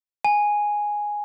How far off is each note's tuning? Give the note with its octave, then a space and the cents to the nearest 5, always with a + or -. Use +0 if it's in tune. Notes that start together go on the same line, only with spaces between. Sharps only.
G#5 +0